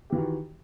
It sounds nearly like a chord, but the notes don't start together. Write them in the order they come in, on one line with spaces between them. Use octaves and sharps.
G4 E3 F#4 D#3